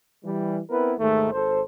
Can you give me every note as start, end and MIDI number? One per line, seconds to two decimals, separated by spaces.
0.24 0.59 52
0.24 0.59 55
0.70 0.92 59
0.70 0.92 60
0.70 0.92 64
0.70 0.92 70
0.70 0.92 71
0.99 1.32 39
0.99 1.32 44
0.99 1.32 51
0.99 1.32 57
1.32 1.60 32
1.32 1.60 69
1.32 1.60 72